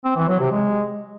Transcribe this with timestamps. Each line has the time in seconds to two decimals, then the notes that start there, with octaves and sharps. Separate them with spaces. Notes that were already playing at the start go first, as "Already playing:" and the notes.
0.05 C4
0.16 E3
0.28 F#3
0.40 C3
0.52 G#3